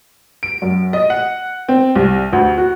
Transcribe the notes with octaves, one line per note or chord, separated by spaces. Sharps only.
D7
F#2
D#5
F#5
C4
C2
D2
F#4